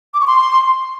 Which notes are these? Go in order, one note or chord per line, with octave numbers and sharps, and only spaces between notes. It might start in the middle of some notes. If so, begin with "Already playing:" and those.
D6
C#6
C6